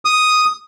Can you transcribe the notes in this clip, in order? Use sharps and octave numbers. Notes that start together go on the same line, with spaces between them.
D#6